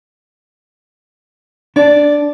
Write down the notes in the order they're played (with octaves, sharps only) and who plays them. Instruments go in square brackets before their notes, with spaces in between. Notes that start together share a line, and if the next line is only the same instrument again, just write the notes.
[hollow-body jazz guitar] D4 [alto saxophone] D5